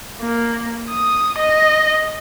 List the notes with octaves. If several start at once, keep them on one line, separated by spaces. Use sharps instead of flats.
A#3
D#6
D#5